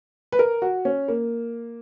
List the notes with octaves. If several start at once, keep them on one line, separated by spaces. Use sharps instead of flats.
B4
A#4
F#4
C#4
A#3